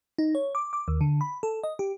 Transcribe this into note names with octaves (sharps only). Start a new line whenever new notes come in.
D#4
C#5
D6
D6
D#2
D3
B5
A4
D#5
G4